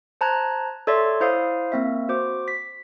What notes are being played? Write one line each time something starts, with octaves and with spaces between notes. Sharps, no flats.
C5 A5 A#5 F#6 G#6
A4 C#5 D5 E5 C6
E4 C5 F5 D#6
A#3 C4 E5
F#4 C5 D6
B6